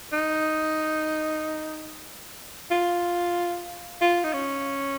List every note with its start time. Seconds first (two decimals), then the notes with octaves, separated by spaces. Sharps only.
0.12 D#4
2.71 F4
4.01 F4
4.24 D#4
4.33 C#4